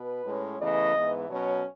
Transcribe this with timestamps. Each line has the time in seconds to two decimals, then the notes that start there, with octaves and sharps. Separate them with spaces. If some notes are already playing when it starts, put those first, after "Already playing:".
Already playing: B2 B4
0.25 A2 G#3 C#4
0.60 E2 C#3 E3 A3 D#5
0.95 G#2 E3 B3
1.29 B2 F#3 C#4 C#5